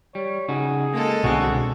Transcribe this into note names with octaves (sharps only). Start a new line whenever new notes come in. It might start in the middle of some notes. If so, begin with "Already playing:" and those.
G3 C#5
C#3 D#4 F#4 G#4
G#3 A#3 A4
C2 B2 D3 B3 C4 F#4 G#4